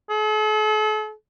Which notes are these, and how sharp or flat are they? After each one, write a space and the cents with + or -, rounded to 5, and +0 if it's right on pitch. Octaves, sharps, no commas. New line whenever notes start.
A4 -45